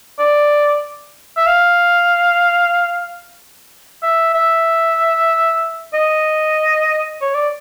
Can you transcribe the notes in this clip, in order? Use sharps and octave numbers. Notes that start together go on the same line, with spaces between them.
D5
E5
F5
E5
E5
D#5
C#5
D5